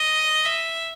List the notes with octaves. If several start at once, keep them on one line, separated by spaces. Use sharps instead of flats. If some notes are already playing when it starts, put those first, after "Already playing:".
Already playing: D#5
E5